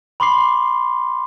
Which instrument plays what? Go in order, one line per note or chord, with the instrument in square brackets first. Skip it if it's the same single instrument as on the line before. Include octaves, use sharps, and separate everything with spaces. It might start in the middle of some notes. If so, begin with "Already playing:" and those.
[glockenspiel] B5 C6 D6 C7